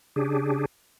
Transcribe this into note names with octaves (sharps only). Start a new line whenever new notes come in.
C#3 D4 G4 G#4